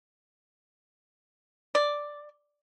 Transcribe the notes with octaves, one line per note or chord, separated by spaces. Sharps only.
D5